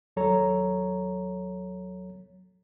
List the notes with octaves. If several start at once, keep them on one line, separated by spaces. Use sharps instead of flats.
D#2 F#3 A4 C#5 A#5